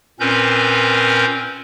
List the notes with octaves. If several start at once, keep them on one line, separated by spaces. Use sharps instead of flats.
A#2 C4 C#4 A#4 B4 G6